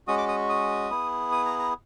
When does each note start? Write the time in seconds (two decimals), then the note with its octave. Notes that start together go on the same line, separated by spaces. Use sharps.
0.07 G#3 C#4 F#4 D#6
0.18 D6
0.28 D#6
0.49 D#6
0.91 B3 E4 G#4
1.32 D#6
1.46 A#5
1.59 A#5